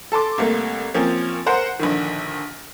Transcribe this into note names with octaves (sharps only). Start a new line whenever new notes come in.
A4 A5 C6 D6
C2 A3 A#3
F3 A#3 C4 C#4
A#4 C5 F#5
A#1 D3 D#3